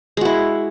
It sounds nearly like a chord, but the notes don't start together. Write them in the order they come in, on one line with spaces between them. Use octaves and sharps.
G#3 F#4 E4